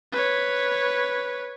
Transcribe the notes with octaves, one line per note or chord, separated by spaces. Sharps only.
B4 C#5